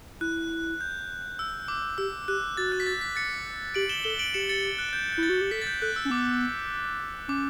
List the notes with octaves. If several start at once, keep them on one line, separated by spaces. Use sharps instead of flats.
E4 F#6
G6
E6
D6
G4 E6
G4 F#6
F#4 A6
F#6
B6
A6
B6
A6 C#7
G4 D7 F#7
E7 G7
A4 E7 G7
D7 F#7
G4 C#7 E7
A6 C#7
F#6
G6
G6
E4
A6
F#4
G4
A4 B6
A6
G6
A4 F#6
E6
C#4
B3 D6
C#4 D6